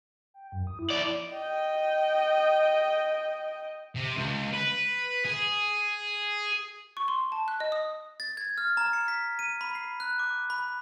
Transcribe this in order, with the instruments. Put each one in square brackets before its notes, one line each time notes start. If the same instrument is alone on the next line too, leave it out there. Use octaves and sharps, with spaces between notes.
[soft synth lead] G5
F#2
D#6
E4
[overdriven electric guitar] F3 D5
[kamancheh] D#5 G5
[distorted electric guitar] C3
C#2
B4
G#4
[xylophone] C#6
C6
A5
F#6
D#5
D#6
[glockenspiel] A6
G#6
F6
A#5
C#7
B6
D#7
B5
C7
F#6
D6
B5